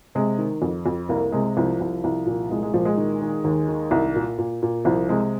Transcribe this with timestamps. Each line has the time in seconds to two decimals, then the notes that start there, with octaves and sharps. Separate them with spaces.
0.15 C3 G#3
0.38 D#3
0.62 F2
0.86 F2
1.09 C2 A#3
1.32 C3 G#3
1.57 C2 F3
1.80 C2
2.04 C2
2.27 A#2
2.50 C2 G#3
2.63 G#3
2.74 A#2 F3
2.85 G#3
2.97 D#3
3.21 D#3
3.44 D#2
3.68 D#3
3.91 C2
4.16 A#2
4.38 A#2
4.63 A#2
4.85 C2 F3
5.09 C3 G#3